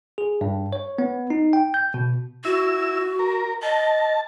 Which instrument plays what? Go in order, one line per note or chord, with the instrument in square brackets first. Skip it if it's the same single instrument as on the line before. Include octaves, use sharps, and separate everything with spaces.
[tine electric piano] G#4
G2
C#5
B3
D#4
G5
G6
B2
[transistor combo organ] E4 E6 [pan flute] F#4
[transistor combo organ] A#4
[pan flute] D#5 [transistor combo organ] A5